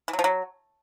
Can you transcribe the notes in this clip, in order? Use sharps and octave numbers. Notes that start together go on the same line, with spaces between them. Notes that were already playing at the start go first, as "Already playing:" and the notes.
E3
F#3
F3
F#3